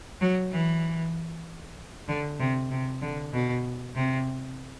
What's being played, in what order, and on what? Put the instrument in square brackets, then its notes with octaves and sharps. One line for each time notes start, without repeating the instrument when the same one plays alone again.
[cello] F#3
E3
D3
C3
C3
D3
B2
C3